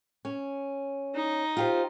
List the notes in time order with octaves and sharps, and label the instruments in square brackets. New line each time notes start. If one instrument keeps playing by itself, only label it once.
[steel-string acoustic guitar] C#4
[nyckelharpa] D#4
[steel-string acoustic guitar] F4 G4 C5